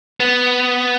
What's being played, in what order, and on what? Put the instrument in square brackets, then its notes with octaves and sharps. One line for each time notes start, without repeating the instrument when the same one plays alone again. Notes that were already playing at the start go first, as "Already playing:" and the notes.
[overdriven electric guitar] B3